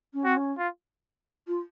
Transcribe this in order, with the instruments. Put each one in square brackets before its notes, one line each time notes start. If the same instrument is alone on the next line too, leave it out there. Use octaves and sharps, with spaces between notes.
[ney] C#4
[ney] C4 [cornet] F#4
[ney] C#4
[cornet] F4
[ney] F4